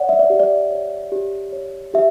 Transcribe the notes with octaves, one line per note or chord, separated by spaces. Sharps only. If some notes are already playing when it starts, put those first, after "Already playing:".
Already playing: C#5 D5 F#5
E5
D5
G4
D5
C#5
G4
C#5
G4 E5